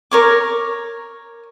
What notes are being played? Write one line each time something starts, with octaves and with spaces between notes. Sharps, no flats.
A#4 C#5 D6